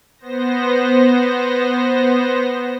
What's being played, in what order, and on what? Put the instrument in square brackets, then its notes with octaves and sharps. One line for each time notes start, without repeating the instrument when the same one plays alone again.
[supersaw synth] B3 C5 A#6